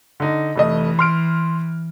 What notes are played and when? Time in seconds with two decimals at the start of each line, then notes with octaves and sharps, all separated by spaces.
0.20 D3 D#4
0.56 F1 E3 A3 D#5
0.99 C6 F6 D7